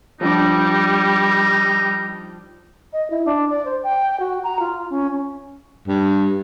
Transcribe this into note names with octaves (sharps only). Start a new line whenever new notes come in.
F3 G3 D4 D#4 D6
D#5
E4
D4
D5
C5
G5
F#4
A#5
F4
C#4
G2